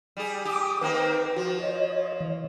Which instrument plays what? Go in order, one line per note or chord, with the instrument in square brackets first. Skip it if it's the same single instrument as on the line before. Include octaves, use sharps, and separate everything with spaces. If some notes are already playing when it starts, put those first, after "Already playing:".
[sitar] G3 G#4
[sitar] G4 [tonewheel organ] D6 D#6
[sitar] D#3 A#3 C4 [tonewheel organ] B4 G5
[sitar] F3 [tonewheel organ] F#4
[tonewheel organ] C#5 D#5
E3